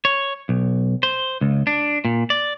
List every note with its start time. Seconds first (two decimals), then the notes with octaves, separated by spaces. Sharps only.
0.05 C#5
0.49 B1
1.03 C5
1.41 C#2
1.67 D4
2.05 A#2
2.30 D5